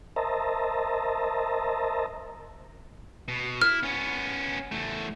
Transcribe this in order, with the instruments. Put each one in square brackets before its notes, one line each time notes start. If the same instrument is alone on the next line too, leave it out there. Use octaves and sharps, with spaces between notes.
[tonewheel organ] A#4 C5 D#5 E5 A5 A#5
[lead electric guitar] B2
[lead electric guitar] E4 [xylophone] F6
[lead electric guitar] B3 C#4
E2 A3